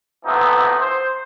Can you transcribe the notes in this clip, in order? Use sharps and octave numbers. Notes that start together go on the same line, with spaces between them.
A2 C3 E3 F3 B3 D#4
C5